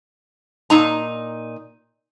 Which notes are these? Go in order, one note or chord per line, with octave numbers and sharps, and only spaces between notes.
A#2 D#4 A#5